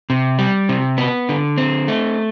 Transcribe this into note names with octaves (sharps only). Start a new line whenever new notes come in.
C3
G3
C3
B3
D3
C4
A3